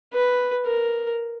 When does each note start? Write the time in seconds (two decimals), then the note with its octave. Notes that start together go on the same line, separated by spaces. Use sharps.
0.13 B4
0.65 A#4